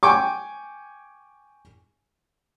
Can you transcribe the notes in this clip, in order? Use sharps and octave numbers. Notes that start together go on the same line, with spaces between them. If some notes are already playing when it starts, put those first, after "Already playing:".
G5 G#5 C#6 D6